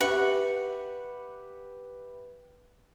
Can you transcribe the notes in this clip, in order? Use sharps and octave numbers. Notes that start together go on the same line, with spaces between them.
G4 B4 E5 F#5 C#6